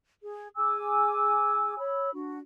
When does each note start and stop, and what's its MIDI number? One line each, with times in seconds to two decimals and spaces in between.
0.23 0.48 68
0.57 1.76 68
0.57 1.76 80
0.57 1.76 86
0.57 1.76 88
1.78 2.11 73
1.78 2.11 83
1.78 2.11 88
2.14 2.38 62
2.14 2.38 66